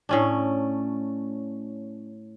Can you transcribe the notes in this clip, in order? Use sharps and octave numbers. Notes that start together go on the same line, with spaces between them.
A2 C#4 D4